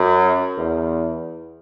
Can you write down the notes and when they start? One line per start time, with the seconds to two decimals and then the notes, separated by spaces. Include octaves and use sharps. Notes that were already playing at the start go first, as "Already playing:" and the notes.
Already playing: F#2
0.57 E2